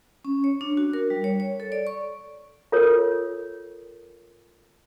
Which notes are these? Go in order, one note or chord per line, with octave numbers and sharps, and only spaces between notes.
C#4
C#5
D4
F#4
A#4
G3
C#5
C#5
A4
D5
C#6
F4 A4 A#4 C#5